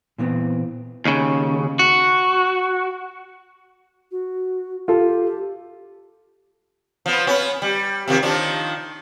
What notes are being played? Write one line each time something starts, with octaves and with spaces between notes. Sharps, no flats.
A#2 E3 B3 C4
D#2 C#3
F#4
F#4
F4 G4 A4
F3 B3
B3 C#4
G3
C3 D#3 F3
D#3 F3 D4